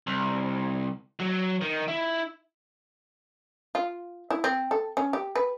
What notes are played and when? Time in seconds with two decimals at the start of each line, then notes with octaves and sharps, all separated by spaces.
0.07 C2
1.19 F#3
1.61 D#3
1.88 E4
3.75 F4
4.30 E4
4.44 C4
4.71 A4
4.97 C#4
5.13 G4
5.35 B4